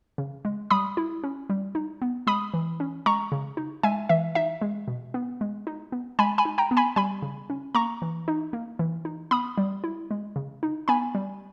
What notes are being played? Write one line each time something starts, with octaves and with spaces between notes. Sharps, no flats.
C#3
G#3
G3 B5 D#6
E4
C#4
G3
D#4
B3
G#3 B5 D#6
E3
C#4
G#3 A#5 C#6
C#3
D#4
G#3 E5 G#5
E3 E5
D#4 E5
G#3
B2
B3
G#3
D#4
B3
G#3 G#5 B5
G#5 B5
D#4
G5 A#5
B3
G#5 B5
G3 G#5 B5
C#3
C#4
A#3 A#5 C#6
E3
D#4
A#3
E3
D#4
B3 B5 D#6
G3
E4
G#3
C#3
D#4
B3 G#5 B5
G3